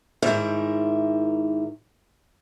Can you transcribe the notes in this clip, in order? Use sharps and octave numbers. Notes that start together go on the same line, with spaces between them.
G#2 D#3 G3 E4 A#4 E5